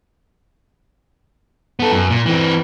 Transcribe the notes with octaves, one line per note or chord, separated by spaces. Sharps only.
B3 A4
F#2
A#2
E3 C4